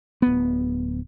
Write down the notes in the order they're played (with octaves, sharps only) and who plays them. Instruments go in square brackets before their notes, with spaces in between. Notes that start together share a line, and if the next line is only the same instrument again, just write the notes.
[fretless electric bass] D1 B3